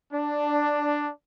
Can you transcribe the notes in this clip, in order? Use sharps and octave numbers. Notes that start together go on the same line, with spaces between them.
D4